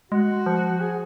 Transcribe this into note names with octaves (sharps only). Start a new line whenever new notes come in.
G#3 F#4
F3
G#4